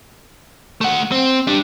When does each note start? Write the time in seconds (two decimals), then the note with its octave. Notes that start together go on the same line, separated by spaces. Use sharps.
0.81 A3 F#5
1.12 C4
1.47 G3 D4